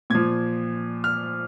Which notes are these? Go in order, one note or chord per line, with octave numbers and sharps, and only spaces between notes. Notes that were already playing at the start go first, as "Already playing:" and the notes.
A#2 F3 G#6
F6